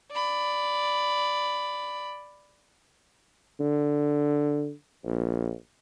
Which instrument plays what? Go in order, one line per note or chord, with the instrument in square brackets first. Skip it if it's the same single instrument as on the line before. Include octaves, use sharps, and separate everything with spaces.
[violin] D5 B5
[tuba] D3
A#1